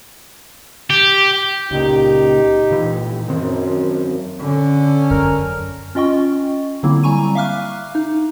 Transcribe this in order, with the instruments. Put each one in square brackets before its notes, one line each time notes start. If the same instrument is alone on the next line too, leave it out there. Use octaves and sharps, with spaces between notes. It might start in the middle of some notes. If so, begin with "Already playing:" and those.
[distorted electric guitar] G4
[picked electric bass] C#2 A#2 [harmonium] D#4 G4
[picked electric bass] A#2 E3
[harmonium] F#2 [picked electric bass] D#3 C4
[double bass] D3 [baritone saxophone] C#4
[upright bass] F#2 [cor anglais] A#4
[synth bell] C#4 F4 D#5 G5 C#6
D3 F#3 A#3 C4 E4
G3 G#5 A#5 C#6 D#7
E5 F5 D6 F6 F#6
D#4